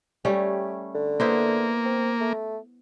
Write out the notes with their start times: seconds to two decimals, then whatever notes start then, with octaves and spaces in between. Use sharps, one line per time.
0.25 G3 A3 C#4 G4
0.95 D3
1.20 A#3 B3 E4 C5
1.85 C4
2.20 A3